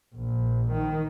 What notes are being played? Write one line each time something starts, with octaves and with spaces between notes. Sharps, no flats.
A#1
D#3